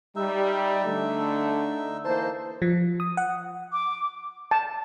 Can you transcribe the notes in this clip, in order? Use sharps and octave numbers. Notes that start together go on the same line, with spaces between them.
G3 D#4 E5
D3 A3
E3 A#3 D#4 C5 A5
F3
D#6
F#5
D6
A5